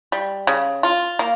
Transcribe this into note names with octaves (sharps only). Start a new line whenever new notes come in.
G3
C#3
F4
A#3